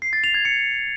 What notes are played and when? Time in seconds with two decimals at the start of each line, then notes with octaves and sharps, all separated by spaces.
0.02 C7
0.13 A6
0.24 F7
0.34 G#6
0.45 C#7